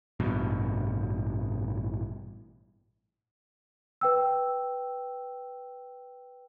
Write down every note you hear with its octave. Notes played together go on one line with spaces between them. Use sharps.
A1 G2 B2
B4 G5 E6